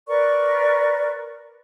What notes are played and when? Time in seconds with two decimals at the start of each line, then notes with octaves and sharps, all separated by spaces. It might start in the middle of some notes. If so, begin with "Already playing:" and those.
0.08 A#4 B4 D5 C#6